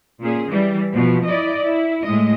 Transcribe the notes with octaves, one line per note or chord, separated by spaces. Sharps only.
A#2 C#4 G#4
E3 G3
B2 F3
E4 D5 D#5
E4
A2 G#3 D#5